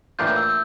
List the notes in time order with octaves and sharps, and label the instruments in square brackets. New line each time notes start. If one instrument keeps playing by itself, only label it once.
[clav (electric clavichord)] A2 E3 A#3 D4 F4 [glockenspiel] G6
[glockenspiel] E6